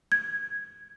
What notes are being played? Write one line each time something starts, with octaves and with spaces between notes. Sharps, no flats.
G#6